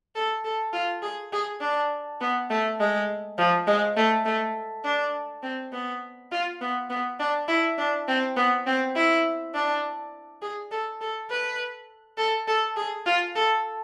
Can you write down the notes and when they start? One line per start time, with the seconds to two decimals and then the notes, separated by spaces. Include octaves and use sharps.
0.16 A4
0.44 A4
0.73 F4
1.02 G#4
1.33 G#4
1.61 D4
2.21 B3
2.50 A3
2.79 G#3
3.38 F3
3.67 G#3
3.96 A3
4.25 A3
4.84 D4
5.43 C4
5.72 B3
6.32 F4
6.61 B3
6.90 B3
7.20 D4
7.48 E4
7.78 D4
8.08 C4
8.36 B3
8.66 C4
8.96 E4
9.54 D4
10.42 G#4
10.71 A4
11.01 A4
11.30 B4
12.18 A4
12.48 A4
12.76 G#4
13.06 F4
13.36 A4